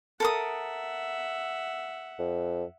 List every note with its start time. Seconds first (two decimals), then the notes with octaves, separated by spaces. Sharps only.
0.20 A4 A#4 E5 F#5 D#6
2.19 F2